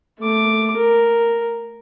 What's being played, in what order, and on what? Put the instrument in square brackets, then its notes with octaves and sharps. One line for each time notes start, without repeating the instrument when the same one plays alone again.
[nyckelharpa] A3 D6
A#4